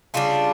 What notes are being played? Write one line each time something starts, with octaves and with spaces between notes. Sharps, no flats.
C#3 G3 D4 F4